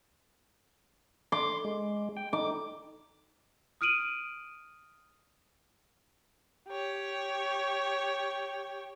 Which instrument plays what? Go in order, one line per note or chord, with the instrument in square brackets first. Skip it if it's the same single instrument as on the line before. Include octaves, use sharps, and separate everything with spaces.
[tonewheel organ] C6 [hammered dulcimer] D6
[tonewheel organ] G#3
G5
[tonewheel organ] D#4 [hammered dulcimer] D6
[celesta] D#6 F6 D7 D#7 F#7
[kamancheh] G4 C#5